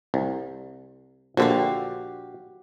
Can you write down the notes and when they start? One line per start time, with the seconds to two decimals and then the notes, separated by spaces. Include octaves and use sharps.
0.14 C2
1.37 A#1 D3 F#4 G4 F5